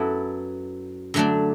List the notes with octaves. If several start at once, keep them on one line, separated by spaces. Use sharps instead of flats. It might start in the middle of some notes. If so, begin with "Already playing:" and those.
Already playing: F#2 F#3 B3 E4 A4
D3 F#3 A3 D4